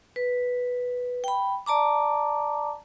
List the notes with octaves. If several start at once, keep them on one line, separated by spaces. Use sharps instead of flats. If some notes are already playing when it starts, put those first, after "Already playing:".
B4
G5 B5
D5 A5 A#5 D6